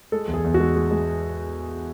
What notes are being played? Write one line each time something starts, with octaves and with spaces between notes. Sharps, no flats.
G#3 A4
E2
G#4
E2
F#4
G#3
G#3
G#3